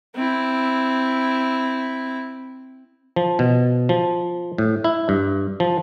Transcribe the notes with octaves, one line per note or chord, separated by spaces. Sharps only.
C4 E4
F3
B2
F3
A2
E4
G2
F3